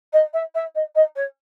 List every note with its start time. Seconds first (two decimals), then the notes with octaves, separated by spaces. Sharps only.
0.13 D#5
0.33 E5
0.55 E5
0.75 D#5
0.95 D#5
1.16 C#5